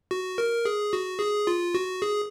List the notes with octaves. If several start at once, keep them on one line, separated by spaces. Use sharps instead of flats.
F#4
A#4
G#4
F#4
G#4
F4
F#4
G#4